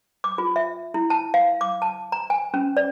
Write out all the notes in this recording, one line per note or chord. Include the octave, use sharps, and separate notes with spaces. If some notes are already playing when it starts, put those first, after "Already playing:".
D6
F4
E5
E4
A5
F5
D6
A5
A#5
G#5
C#4
D5